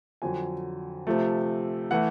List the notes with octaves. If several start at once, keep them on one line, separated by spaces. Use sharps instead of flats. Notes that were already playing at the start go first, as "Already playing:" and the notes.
F2 D3 F#3 G#5
C3 F3 A3
E3 A3 F#5